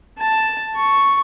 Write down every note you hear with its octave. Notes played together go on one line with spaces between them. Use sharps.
A5
C#6